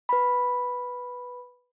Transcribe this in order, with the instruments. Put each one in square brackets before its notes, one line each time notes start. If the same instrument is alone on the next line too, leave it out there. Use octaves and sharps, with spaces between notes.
[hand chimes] B4 B5